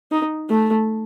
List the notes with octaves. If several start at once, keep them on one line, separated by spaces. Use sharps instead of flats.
D#4
A3